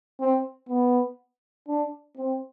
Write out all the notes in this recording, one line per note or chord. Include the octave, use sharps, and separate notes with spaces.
C4
B3
D4
C4